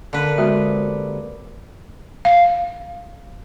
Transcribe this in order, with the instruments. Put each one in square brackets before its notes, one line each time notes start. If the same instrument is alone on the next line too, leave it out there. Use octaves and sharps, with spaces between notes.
[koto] D3 B4 [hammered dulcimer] A#3
[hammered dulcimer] C3 [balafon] G#3 B3 F#4
[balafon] F5